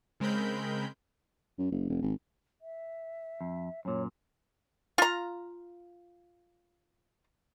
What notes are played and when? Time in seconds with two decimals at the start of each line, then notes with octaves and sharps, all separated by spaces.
0.20 C#3 G#3 C4 A#4 B5 G6
1.59 F#2
1.72 F#1
1.89 F1
2.02 G#1
2.61 E5
3.41 F2
3.85 F#2 A#2 C#5
4.98 F4 A#5